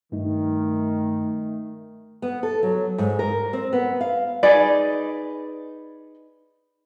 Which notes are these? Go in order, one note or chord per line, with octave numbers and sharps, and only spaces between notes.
G2 D#3 A3 D#4
B3
A4
F#3
G#2
A#4
C4
B3
F5
D#4 G#4 B4 D5